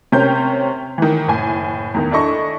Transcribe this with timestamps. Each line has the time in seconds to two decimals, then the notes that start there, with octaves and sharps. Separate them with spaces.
0.12 C3 C#4 A#4 G5 G6
0.98 D#3 E3
1.27 F#1 A2 G#5
1.94 E2 D#3
2.11 D4 E4 A4 D#5 C#6